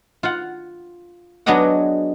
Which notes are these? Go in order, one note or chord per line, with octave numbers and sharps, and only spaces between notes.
F4 F#5
F#3 B3 D4 G#4 D#5 F#5